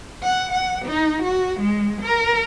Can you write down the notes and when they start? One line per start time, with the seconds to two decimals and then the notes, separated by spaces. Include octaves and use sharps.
0.23 F#5
0.52 F#5
0.85 D#4
1.23 F#4
1.60 G#3
2.02 A#4